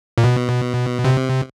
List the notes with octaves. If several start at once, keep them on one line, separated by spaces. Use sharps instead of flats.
A#2
B2
C3